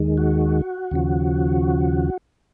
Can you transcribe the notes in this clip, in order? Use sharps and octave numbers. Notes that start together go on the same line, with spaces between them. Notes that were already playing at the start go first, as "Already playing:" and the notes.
Already playing: D#2 D#3 G#3
F#4
D#2 C#3 F3